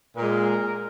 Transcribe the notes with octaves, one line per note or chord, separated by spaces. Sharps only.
A#2 G#3 A#4